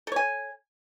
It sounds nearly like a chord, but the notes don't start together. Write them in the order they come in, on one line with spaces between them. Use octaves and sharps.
A4 C#5 G#5